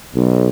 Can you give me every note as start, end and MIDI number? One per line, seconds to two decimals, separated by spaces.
0.15 0.49 35